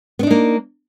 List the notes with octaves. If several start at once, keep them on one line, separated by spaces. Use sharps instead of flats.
A#3 B3 D4 D#4